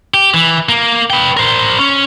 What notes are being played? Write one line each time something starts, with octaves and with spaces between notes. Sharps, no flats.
G4
E3
A#3
B4 G5
A#4 C5
C#4